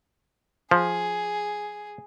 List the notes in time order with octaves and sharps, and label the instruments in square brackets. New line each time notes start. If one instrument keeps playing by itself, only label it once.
[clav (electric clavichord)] F3 [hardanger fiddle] G#4